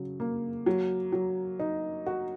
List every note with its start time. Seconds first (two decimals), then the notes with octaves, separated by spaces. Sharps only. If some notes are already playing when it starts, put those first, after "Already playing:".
Already playing: C#3 F#3
0.20 A#3
0.66 F#3
1.13 F#3
1.60 D#4
2.06 F#4